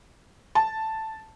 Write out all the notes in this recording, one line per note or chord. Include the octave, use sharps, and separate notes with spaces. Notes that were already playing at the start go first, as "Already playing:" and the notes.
A5